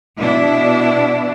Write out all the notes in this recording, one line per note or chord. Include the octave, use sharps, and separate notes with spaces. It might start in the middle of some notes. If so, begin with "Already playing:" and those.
B2 D4 E4